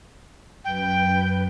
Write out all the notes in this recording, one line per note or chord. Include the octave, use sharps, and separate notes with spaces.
F#2 B4 G5